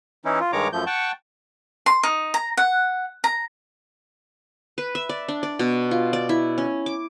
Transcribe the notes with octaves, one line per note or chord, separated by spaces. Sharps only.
E3 C#4 D#4 E4
F4
G2 D#3 G#3 C#5 A#5 D6
F#2 F3 A3 G6
F#5 G5 A5 C#6
C6
D#4
A#5
F#5
A#5
B4
E5
D5
D4
D5
B2
F4
D5
E4
C#4
D6